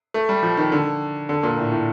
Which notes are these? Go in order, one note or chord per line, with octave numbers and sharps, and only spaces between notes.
A3
G3
F3
D#3
D3
D3
A#2
A2
A2